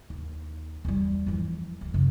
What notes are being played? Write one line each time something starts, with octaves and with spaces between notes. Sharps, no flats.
D#2
E2 G3
E3 F3
D2
F#2 C#3